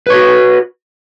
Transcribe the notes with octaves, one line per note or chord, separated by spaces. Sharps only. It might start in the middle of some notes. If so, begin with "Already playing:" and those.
F#4 B4 C#5